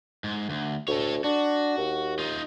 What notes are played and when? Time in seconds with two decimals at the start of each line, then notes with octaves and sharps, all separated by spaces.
0.24 G#2
0.50 D2
0.88 D2 A4 C#5
1.24 D4 F#4
1.78 D#2
2.19 D#4 F4